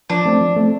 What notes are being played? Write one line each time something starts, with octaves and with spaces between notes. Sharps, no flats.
F3 D4
A3 C4
F3
A3 C4